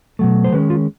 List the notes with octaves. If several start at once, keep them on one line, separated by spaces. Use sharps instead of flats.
B2 F#3 A3
C5
D#3 G#3 C#4 B4
F4